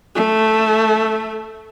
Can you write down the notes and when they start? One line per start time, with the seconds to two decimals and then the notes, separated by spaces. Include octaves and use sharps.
0.15 A3